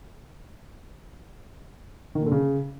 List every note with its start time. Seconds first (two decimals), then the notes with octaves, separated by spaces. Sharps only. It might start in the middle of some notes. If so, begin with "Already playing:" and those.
2.15 D#3
2.21 A#2
2.26 D3
2.32 C#3